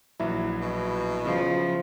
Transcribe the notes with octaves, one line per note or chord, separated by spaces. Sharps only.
A#1 E3 F#3 E4
B2
C#3 F3